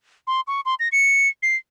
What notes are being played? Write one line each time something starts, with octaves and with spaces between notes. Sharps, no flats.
C6
C#6
C6
A#6
C#7
C7